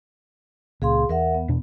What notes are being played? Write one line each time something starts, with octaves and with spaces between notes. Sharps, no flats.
C#2 A#2 G#4 F5 C6
E2 A#4 E5 F#5
B3
E2 B2 D4